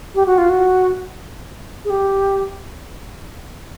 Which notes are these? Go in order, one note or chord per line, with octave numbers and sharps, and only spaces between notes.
G4
F#4
F4
F#4
G#4
G4